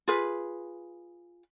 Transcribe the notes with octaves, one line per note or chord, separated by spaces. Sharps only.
F4 G#4 B4